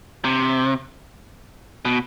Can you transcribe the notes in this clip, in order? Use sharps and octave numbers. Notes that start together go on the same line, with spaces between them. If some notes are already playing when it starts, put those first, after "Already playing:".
C3
B2